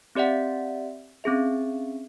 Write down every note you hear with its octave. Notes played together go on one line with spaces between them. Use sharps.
C4 G4 D5 E5 F#5
C4 C#4 G#4 E5